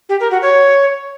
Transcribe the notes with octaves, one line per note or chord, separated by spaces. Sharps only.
G4
A#4
F#4
C#5